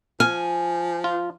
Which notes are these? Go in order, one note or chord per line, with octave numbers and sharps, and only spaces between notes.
F3 G#5 F6
F4